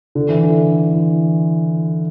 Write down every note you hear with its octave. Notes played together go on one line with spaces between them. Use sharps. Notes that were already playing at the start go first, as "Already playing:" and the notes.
D3
E3
D3
E3